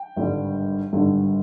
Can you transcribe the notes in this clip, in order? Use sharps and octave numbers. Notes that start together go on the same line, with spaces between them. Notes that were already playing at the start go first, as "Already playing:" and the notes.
Already playing: G5
G#1 G2 D3 G3
G#1 G2 D3 G3